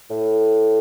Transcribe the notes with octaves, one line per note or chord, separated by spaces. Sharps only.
A2